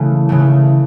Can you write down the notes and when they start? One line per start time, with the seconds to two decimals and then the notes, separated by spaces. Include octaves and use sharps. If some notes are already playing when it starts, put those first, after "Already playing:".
Already playing: C#3 E3 A3
0.29 C#3 E3 A3